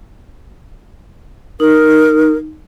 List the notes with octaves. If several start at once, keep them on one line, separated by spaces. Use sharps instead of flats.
D#4 A#4